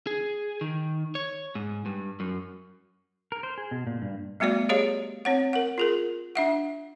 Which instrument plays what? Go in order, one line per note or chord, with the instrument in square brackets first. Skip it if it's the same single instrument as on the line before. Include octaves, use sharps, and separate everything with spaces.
[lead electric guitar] G#4
D#3
C#5
G#2
G2
F#2
[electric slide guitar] A#4
C5
G#4
B2
A#2
G2
[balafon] G3 A3 B3 F#4 D5
G4 G#4 C#5 D#5 F5
C4 C#5 F#5
A#4 F#5
F4 G#4 A#4
D4 E5 F#5